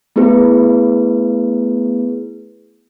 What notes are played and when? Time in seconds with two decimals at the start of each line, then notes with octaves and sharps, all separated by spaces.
0.16 A3 B3 E4 G#4 B4